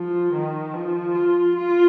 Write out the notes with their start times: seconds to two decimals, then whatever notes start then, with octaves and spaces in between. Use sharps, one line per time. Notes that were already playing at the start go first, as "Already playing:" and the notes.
Already playing: F3
0.33 D#3
0.74 F3
1.15 F4
1.56 F4